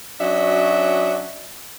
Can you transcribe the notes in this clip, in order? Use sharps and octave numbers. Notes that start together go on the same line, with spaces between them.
F#3 C#4 D4 F#4 D#5 E5